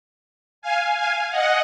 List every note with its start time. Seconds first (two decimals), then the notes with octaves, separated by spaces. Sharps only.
0.62 F5 G#5
0.96 F5 G#5
1.30 D#5 F#5